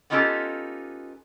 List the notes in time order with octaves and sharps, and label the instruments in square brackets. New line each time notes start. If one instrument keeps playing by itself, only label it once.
[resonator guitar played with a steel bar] B3 C#4 D#4 F4 G4 A4